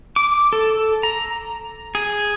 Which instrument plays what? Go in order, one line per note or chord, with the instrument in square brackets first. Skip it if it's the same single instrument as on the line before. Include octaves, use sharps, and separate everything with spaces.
[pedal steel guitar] D6
A4
A#5
G#4